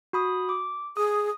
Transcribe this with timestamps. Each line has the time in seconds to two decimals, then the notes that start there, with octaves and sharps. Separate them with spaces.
0.13 F#4 B5 D#6
0.49 D6
0.97 G#4 D#6